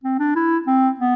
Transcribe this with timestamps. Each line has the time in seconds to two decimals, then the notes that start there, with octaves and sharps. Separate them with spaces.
0.04 C4
0.19 D4
0.35 E4
0.67 C4
0.99 B3